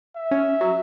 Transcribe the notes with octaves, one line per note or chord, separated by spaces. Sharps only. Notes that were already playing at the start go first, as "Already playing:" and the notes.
E5
C#4
F#3